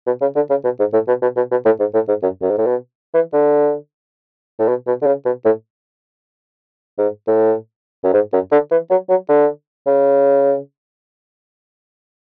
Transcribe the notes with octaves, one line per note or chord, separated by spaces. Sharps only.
B2
C#3
D3
C#3
B2
G#2
A2
B2
B2
B2
B2
A2
G#2
A2
G#2
F#2
F#2
G#2
A2
B2
E3
D3
A2
B2
B2
D3
C#3
B2
A2
G#2
A2
F#2
G#2
F#2
D3
E3
F#3
F#3
D3
C#3